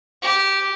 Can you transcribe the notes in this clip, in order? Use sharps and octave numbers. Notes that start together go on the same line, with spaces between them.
G4